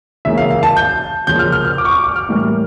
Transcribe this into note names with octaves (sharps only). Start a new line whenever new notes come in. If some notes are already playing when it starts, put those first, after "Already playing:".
C#3 E3 A#3 E5
F5
F5
A5
G6
C#3 F3 A#3 G6
F6
F6
F6
D6
C#6
D6
D6
F6
A2 E3 G3 A#3